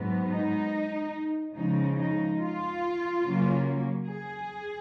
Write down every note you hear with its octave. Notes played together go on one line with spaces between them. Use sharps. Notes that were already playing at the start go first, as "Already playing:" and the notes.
Already playing: G#2 F#3 B3
D#4
C#3 F3 G#3 D#4
D#4
F4
C#3 F#3 A#3 C#4
G#4